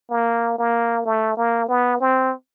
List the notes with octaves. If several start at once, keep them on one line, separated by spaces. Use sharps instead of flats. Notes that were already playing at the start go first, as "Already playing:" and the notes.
A#3
A#3
A3
A#3
B3
C4